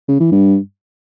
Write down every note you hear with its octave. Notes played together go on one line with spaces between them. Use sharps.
C#3
E3
G2